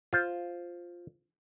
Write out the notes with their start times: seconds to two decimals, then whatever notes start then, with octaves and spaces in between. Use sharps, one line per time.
0.13 F4 C5